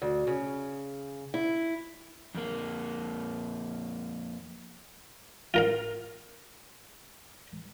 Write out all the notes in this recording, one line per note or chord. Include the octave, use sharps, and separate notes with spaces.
D2
C#3
E4
F2 A#3
F4 A#4 F5